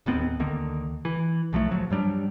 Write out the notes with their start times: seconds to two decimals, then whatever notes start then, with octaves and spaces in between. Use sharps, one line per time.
0.06 D1 D#2 B3 C4
0.40 D2 D3 D#3 A#3
1.05 E3
1.53 B1 F3 F#3 A3
1.70 D1 F3 F#3
1.90 G2 F#3 G3 D4